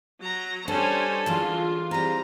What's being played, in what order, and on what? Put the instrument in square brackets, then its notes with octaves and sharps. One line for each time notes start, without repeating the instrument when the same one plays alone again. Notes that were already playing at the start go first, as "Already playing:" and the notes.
[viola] F#3 A#5
[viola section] G3 C#4 [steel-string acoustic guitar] D4 [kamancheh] A4 [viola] C5 G#5
[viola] D3 [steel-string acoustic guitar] E3 F#3 G#3 [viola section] F4
[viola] G3 [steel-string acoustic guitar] G#3 C4 [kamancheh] A#5